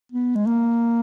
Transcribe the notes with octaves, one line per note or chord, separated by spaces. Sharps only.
B3
G#3
A#3